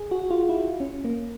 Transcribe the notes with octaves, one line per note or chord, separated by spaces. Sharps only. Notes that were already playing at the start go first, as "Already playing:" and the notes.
Already playing: G#4
F#4
F4
E4
C#4
A#3